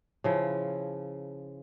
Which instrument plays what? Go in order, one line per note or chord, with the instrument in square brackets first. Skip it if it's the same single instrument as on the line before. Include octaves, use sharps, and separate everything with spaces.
[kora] C#3 F3 E4